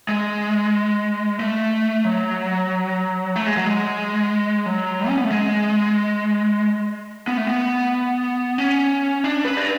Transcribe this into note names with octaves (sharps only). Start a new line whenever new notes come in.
G#3
A3
F#3
A3
G#3
F#3
G#3
F#3
C#4
B3
A3
G#3
B3
A3
B3
C#4
D4
B4
D5